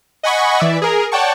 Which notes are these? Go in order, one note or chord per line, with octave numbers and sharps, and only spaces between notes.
D#5 F#5 G#5 B5 C#6
E3 D5 E5
G#4 A#4
C#5 D5 F#5 G5 A5 C#6